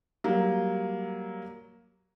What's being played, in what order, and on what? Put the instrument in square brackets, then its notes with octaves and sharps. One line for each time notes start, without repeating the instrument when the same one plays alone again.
[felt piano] F#3 G3 A#3